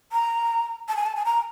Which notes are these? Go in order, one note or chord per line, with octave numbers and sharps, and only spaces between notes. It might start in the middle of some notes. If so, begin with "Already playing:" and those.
A#5
A5
G#5
A5
G#5
A#5